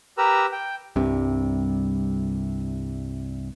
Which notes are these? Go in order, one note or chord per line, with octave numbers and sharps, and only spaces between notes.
G4 A#4 B4 A#5 E6
G5
C2 G2 C3